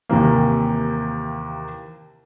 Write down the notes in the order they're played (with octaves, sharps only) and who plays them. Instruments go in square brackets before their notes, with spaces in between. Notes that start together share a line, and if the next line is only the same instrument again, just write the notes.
[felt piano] D#2 C3 E3 A#3